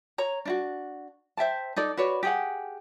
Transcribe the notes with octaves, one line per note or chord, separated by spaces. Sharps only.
C#5 A#5
D4 E4 F#4
C5 E5 G5 A5
D#4 A4 D5
F#4 B4 C#5 D5
G4 G#4 F#5